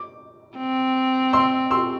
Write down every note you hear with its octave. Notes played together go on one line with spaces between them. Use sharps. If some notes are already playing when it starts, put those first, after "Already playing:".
Already playing: D6
C4
C6 E6
C6 E6